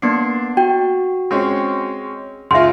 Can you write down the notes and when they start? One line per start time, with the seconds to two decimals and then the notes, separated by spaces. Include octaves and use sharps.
0.02 A#3 B3 D4 C7
0.57 F#4 G5
1.31 G#3 C4 C#4
2.51 C#2 F4 E5 C6